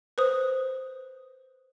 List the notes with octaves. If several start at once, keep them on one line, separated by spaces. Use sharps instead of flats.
B4 C5 D#6